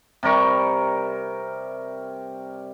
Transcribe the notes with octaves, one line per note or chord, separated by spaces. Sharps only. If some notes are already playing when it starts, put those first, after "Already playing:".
C3 G3 A#4 C#6